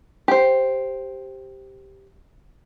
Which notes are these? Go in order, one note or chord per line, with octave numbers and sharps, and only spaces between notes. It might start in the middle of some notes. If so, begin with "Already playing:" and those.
G4 C5